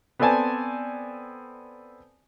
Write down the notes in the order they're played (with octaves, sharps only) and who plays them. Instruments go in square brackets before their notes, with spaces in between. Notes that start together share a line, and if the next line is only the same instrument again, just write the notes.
[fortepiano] B3 C4 A4 D5 G#5 A5